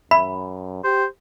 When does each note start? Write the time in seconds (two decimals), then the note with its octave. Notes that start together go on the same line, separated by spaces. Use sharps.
0.11 F#2 E5 B5
0.84 G4 C5